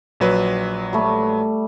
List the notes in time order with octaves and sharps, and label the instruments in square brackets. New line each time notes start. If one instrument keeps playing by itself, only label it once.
[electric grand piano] A#1 F#3 B4
[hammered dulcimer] G3 A3